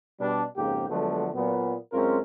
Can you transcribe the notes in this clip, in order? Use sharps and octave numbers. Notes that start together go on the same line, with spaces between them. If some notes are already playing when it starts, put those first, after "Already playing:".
B2 G3 D4
F2 G#2 C#3 A#3 G4
D3 F3 F#3 G#3 A3 B3
A#2 F#3 B3
F#2 G#3 C4 C#4 F4 A#4